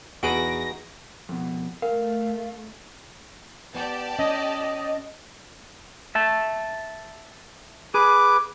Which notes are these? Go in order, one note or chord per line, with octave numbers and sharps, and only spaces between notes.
E2 D#4 F#4 G#4 B4 A#6 D7
F2 B2
A3 A#4 F5
B3 G4 D5 A5
C#4 D#5
E5 A5
G#4 B4 D6